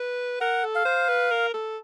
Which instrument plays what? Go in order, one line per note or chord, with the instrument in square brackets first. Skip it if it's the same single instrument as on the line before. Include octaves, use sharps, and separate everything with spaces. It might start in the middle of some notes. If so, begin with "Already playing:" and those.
Already playing: [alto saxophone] B4
[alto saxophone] A#4 [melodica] F#5
[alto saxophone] A4
[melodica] F5
[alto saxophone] C5
B4
A#4
A4